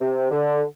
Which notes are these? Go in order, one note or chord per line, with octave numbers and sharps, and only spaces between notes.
C3
D3